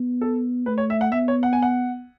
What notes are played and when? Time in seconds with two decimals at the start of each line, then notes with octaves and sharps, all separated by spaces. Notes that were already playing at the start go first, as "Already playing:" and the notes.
Already playing: B3
0.21 A4
0.66 A3 B4
0.78 C#5
0.90 E5
1.01 F#5
1.12 B3 E5
1.28 C#5
1.43 F#5
1.53 G#5
1.62 F#5